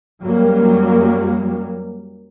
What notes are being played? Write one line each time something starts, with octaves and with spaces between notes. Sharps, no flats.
F#2 F#3 G3 A#3